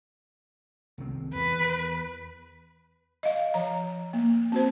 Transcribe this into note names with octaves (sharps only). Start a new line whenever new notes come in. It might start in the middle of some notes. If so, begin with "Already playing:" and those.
C2 D#3 C4
E2 B4
D#5 F5
F3 A#5
A#3
C4 F#4 C5